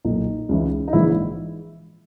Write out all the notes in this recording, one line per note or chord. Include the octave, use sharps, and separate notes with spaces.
B1 A#2 D#4
C#2 C#3 E3
D#4
A#1 G#2 E3 E4